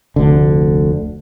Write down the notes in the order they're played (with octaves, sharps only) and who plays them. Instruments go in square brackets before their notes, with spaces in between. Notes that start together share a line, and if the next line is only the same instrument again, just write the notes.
[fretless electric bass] F1 D2 D3